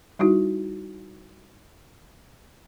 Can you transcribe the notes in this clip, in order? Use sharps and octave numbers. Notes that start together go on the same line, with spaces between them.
G3 D#4 E4 F#4